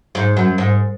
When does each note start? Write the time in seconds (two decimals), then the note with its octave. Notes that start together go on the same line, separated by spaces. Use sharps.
0.15 G#2
0.37 F#2
0.58 G#2